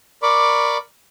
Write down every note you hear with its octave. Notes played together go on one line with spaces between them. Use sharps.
A#4 D5 B5 C#6 D6